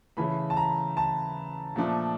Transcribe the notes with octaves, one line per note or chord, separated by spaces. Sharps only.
C#3 E3 A3 B5
A5
A#5
A5
A#2 F3 A3 D4